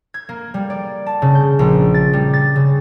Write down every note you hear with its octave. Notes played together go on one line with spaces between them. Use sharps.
G#6
A#3
G3
D5
A5
C#3
G6
A#1
A6
G3
A6
C#3